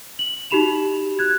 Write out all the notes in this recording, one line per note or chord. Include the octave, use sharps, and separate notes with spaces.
F#7
D#4 F#4 G4 B5 E7 F7
F#6 G#6